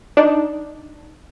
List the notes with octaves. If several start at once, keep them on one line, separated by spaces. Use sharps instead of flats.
D4 D#4